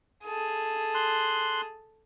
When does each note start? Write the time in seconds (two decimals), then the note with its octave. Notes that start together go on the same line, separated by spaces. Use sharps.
0.25 G#4 A4
0.95 C6 F#6